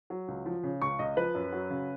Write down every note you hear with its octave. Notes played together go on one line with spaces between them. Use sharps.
F#3
C#2
F3
C#3
C#2 C#6
C#2 D#5
F3 B4
F#2
F#3
C#3